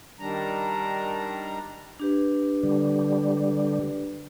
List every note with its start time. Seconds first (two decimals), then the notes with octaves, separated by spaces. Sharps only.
0.20 D#3 G3 D4 A#5
1.99 D4 G4 B4
2.63 D3 G3